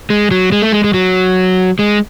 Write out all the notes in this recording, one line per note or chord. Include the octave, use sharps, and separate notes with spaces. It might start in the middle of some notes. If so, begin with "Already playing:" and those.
G#3
F#3
G#3
A3
G#3
G#3
F#3
G#3